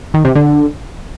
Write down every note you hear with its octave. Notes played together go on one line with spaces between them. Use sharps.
D#3
C3
D3